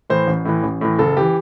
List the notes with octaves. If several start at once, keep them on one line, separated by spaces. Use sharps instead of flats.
A2 E3 C5
A1
A2 E3
A1
A2 E3
F#1 A4
E3 G4